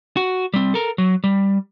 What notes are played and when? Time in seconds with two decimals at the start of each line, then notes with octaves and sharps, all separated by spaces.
0.17 F#4
0.54 G3 C4
0.74 A4 A#4
0.98 F#3
1.24 G3